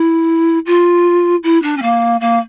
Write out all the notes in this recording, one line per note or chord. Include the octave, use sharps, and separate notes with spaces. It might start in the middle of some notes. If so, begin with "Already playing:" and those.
Already playing: E4
F4
E4
D4
C#4
A#3
A#3